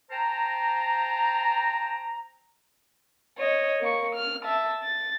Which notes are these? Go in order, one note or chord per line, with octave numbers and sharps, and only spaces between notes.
C5 G5 A5 A#5
C#5 D#5
A#3 C#6
F6
E5 A5
A6